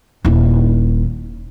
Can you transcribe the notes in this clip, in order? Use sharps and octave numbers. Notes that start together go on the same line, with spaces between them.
D#1 E4